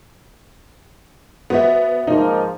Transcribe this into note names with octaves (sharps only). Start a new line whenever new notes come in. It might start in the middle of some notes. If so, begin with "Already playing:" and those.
B3 F#4 C5 E5
G#2 F3 A#3 D#4